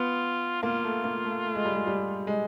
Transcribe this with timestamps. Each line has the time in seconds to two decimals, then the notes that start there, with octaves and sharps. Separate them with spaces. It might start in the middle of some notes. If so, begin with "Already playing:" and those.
Already playing: B3 F4
0.63 A#3 F4
0.84 A3
1.04 A#3
1.24 A3
1.45 A3
1.55 G#3
1.65 G3
1.76 G#3
1.87 G3
2.27 G#3